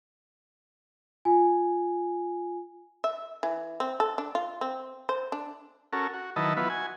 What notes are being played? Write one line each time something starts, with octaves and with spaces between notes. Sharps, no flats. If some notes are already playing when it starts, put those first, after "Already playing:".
F4 G#5
E5
E3
C4
A4
D4
F4
C4
C5
D4
C#4 F#4 A4 A#4
F#4
D#3 F#3 E4 B4 D#5 A5
F#3 B3 E4 F4 B4
F#4 G#5